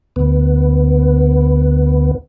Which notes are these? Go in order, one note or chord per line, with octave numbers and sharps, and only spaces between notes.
D2 B3